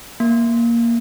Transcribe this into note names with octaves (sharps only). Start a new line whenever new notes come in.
A#3